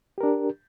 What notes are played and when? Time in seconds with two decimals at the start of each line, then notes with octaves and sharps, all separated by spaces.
0.18 G4
0.21 A#4
0.23 D4